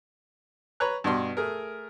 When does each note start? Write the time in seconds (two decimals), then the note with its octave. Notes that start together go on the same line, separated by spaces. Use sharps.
0.80 B4 C#5 A#5 F#6
1.04 G2 B2 F#4 D5 C6
1.37 A3 G#4 A#4